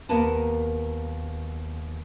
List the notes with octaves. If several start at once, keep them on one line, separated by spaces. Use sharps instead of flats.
D#2 A#3 B3 A#4 B4 A5